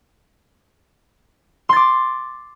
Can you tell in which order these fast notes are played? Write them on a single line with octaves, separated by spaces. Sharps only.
C6 A6 D6